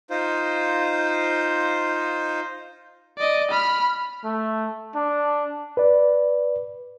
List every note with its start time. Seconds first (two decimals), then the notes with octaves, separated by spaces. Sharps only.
0.10 D#4 F4 C5
3.18 D5 D#5
3.51 B5 F6
4.24 A3
4.95 D4
5.77 B4 D5